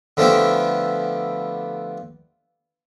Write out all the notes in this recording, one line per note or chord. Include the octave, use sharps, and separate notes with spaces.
D3 F3 A3 B3 E4 G4